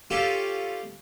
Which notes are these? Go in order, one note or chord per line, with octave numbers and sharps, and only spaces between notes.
C#4 F4 G4 A4